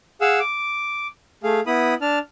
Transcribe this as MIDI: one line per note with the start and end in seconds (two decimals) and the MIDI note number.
0.21 0.39 68
0.21 0.39 77
0.21 0.39 78
0.21 0.39 88
0.40 1.07 86
1.43 1.60 57
1.43 1.60 68
1.43 1.60 77
1.67 1.94 59
1.67 1.94 64
1.67 1.94 83
1.67 1.94 87
2.01 2.19 62
2.01 2.19 81
2.01 2.19 89